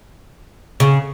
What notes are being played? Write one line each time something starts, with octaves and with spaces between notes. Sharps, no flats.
C#3